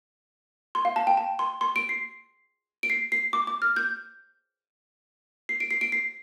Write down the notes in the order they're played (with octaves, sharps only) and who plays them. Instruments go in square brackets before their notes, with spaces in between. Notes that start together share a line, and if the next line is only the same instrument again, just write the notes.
[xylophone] C6
F5
A5
G5
A5
C6
C6
D7
C7
D7
C7
C7
D6
D6
F6
G6
C7
D7
C7
D7
C7